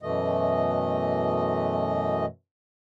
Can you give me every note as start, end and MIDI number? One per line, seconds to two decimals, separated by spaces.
0.02 2.25 42
0.02 2.25 47
0.02 2.25 52
0.02 2.25 57
0.02 2.25 75